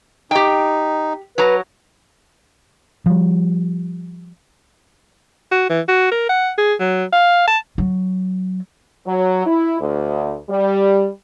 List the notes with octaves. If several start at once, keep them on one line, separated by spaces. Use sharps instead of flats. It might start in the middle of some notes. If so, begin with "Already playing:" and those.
D#4 G4 G5
F#3 B4 A#5
F3 G3
F#4
E3
F#4
A#4
F#5
G#4
F#3
F5
A5
F#3
F#3
E4
D2
G3